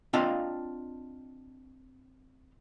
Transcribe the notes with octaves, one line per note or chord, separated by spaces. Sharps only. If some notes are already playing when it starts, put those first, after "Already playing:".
C4 D4 F4 D#5 F5 A5